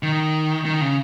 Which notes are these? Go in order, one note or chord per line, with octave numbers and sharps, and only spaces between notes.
D#3
D#3
C#3